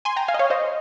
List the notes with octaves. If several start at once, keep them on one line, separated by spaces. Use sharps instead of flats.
G#5 C6
G5 A#5
F5 G#5
D#5
C#5 F5
C5 D#5